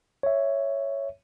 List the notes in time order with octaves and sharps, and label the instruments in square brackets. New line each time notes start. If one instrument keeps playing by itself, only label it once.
[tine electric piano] C#5 E5